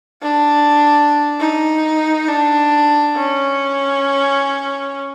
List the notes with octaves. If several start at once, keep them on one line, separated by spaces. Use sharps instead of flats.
D4
D#4
D4
C#4